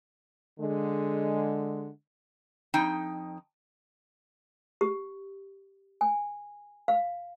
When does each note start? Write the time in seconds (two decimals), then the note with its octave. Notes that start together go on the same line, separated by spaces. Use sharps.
0.60 D3 G#3
2.74 F2 D#4 G5
4.81 G4
6.01 G#5
6.88 F5